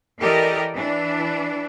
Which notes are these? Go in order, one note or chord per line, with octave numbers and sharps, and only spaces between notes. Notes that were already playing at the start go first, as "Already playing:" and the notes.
E3 G4 A4 A#4 D5 D#5
E3 D4